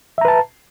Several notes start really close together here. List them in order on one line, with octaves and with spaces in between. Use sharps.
E5 A#5 B4 A5